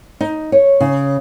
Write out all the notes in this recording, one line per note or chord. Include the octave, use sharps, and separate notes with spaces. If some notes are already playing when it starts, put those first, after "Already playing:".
D#4
C#5
C#3